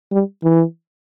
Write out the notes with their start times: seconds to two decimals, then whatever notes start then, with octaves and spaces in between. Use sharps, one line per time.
0.12 G3
0.43 E3